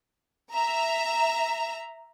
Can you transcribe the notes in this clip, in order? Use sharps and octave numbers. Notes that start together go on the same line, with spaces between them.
E5 A#5